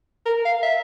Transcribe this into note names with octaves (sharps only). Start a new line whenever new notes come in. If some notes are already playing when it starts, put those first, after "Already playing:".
A#4
F5
E5